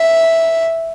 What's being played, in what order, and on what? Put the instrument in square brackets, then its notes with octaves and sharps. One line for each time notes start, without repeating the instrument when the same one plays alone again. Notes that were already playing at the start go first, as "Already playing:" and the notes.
Already playing: [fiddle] E5